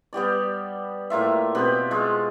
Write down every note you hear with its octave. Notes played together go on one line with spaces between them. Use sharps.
G3 B3 G4 D5
A2 A#3 F4 E5
B2 C4 G4 B4
G#3 F4 C#6